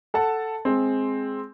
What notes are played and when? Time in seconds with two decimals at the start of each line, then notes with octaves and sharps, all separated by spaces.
0.14 A4 F#5 A5
0.65 G#3 C4